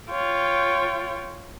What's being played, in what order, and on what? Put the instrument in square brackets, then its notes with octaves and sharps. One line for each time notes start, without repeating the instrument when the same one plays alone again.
[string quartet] F4 C#5 G5